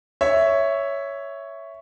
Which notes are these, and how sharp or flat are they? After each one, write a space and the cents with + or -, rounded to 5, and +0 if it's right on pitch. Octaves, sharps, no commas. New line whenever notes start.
C#5 +5 E5 +0